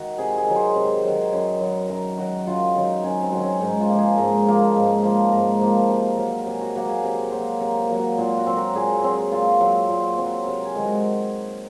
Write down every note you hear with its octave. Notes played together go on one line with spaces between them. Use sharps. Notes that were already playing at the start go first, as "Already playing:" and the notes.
Already playing: D#3 F#4
C3 G#4
G#4
D#3 F#3
C5
C3
D#3 F#3
F#2
D#3 F#3
F#2 A#4
D#3 F#3 F#4
F#2 F4
D#3 F#3 D#4
F#2 C#4
C4
D#3 F#3
C#4
G#2 D#4
F4
A#3
F3 G#4
G#2 A#4
F3 A#3
G#2
F3 A#3
G#2 A#4
F3 A#3
C3
F#3 A#3
A#4
C3 G#4
F#4
F#3 A#3 F#4
G#4
C3 A#4
F#3 A#3 C5
C3 A#4
A#4
F#3 A#3
F#4
A#2 F4
F#4
F#3 C4
A#4
A#2 G#4
F#3 C4
A#2 F4
F#3 C4
A#2
F#3 C4
C3 A#4
G#4
D#3 G#3
F#4